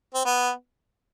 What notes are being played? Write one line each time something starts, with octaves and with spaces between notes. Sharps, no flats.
C4
B3